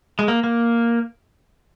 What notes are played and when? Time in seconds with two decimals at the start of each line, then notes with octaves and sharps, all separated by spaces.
0.19 G#3
0.28 A#3
0.44 A#3